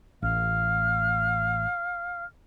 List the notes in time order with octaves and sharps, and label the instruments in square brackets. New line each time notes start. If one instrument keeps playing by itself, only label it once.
[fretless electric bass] A1 [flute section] F5 F6